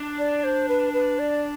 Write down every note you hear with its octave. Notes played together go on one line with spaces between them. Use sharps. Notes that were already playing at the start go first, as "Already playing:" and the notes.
Already playing: D4
D5
C5
B4
B4
D5